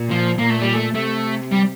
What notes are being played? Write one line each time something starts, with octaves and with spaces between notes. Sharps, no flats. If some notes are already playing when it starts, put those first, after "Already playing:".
Already playing: A#2
F3
A#2 A#3
A3
G3
A3
C3 A3
G3